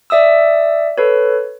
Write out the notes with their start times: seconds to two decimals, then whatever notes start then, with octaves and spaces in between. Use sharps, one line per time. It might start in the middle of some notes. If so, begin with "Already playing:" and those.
0.10 D5 E5 D#6 E6
0.98 A4 B4 C#5